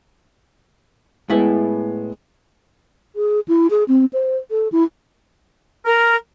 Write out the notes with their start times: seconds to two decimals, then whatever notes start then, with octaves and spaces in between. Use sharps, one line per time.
1.30 A2 G#3 B3 E4 E5
3.16 G#4
3.48 E4
3.70 G#4
3.88 C4
4.13 C5
4.51 A4
4.72 E4
5.86 A#4